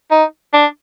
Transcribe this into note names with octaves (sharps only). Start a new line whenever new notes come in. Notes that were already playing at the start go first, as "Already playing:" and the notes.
D#4
D4